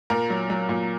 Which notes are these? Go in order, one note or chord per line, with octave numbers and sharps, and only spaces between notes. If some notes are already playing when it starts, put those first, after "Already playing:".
A#2 A#4
F#3
F#3
A#2